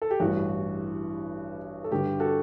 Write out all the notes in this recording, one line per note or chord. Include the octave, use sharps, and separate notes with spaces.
A4
G4
A1 G2 E3 F#4
A4
G2 D3 G3 G4
F#4 A4